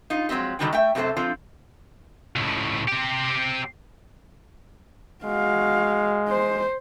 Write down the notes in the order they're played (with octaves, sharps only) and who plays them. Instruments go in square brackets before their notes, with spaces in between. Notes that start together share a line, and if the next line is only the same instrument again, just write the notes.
[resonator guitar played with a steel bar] D#4 F4
F3 F#3 G#3 C4 G4
D3 D#3 G3 D4 F#4 G5
A3 E5 G5
F#2 C3 A3 F#4 A4 C5
F3 C4 D4 F4
[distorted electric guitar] C#2 A2
C4 G4
[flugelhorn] G#3 [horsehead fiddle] F#4 F5
[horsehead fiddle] C5